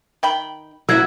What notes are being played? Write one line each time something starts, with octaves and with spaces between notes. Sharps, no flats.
D#3 G5 B5
F#3 A#3 E4 A#4 F#5 E6 G#6